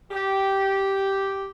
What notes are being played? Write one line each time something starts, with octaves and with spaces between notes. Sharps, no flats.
G4